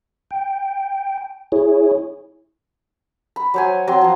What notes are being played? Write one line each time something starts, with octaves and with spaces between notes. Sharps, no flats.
G5
E4 G#4 C#5
B5
F#3 C5 G#5
F#3 C4 C6
F3 C6